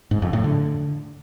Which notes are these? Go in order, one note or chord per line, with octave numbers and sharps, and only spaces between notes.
G#2
F2
A2
D3